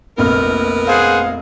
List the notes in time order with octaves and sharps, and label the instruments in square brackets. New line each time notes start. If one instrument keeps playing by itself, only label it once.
[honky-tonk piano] F1 A#1 F6 [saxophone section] B3 A#4
[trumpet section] G#4 C5 F#5 [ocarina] F5